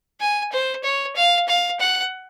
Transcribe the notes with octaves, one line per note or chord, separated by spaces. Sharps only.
G#5
C5
C#5
F5
F5
F#5